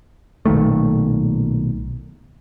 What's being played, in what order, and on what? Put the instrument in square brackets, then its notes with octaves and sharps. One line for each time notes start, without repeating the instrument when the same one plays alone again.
[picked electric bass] B1 A#2 D#3 A3